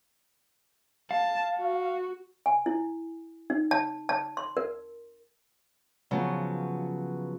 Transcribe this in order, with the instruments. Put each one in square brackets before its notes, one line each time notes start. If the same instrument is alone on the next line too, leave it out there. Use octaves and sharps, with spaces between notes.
[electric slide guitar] F5 [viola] A5
[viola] F#4
[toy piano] G#5
E4
D#4
A5
A5
C6
A#4
[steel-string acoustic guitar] C#3 F3 F#3 B3